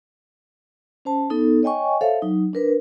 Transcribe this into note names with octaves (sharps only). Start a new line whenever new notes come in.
C#4 C5 A5
B3 D#4 A4
C#5 D#5 G5 G#5 C#6
A4 C5 C#5 E5 F5 A5
F#3 D#4
D4 A#4 B4